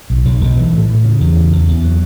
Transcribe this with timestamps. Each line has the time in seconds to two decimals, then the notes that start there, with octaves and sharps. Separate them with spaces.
0.10 B1
0.25 B1
0.41 B1
0.57 E3
0.73 A2
0.89 A2
1.05 C#3
1.20 E2
1.36 C#3
1.52 E2
1.69 E2
1.84 F#3